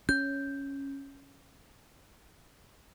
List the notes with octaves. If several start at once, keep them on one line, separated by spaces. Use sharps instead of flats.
C#4 G6